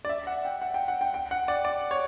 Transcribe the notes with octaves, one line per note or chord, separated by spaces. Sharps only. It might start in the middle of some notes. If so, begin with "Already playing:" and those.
D5
E5
F#5
G5
F#5
G5
F#5
G5
G5
F#5
D5
D5
C#5